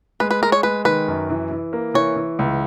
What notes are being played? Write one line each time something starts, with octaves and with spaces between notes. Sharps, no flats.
G#3 B4
B4
G#3 A#4
C#5
G#3 B4
D#3 B4
F#2
E3
E3
A#3
E3 C#5
E3
C#2